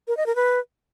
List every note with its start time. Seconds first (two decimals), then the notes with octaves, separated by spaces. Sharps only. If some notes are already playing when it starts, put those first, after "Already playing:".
0.08 A#4
0.17 D#5
0.26 A#4
0.36 B4